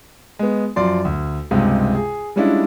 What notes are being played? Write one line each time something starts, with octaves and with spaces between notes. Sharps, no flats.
G#3 B3
F#2 F3 D5 C6
D2
C#2 G2 C3 G#3
G#4
G3 G#3 C#4 D4 E4 F4